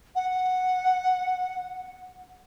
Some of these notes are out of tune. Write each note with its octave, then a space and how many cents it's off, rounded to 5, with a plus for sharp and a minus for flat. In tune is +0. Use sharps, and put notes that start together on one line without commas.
F#5 -5